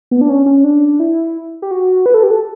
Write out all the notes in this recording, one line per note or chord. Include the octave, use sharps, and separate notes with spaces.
B3
D4
C#4
C#4
D4
E4
G4
F#4
B4
A4
G4
A4